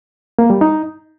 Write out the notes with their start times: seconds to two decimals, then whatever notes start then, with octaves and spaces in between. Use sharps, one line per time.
0.39 A#3
0.50 G3
0.61 D#4